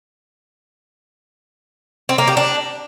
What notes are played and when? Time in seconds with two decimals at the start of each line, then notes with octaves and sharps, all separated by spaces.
2.09 C4
2.18 A#3
2.28 G4
2.37 D4